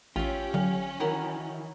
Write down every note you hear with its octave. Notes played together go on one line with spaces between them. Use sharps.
A1 C#4 F4 G4 E5
D3 F#3 F5
D#3 E3 E4 F#4 A#4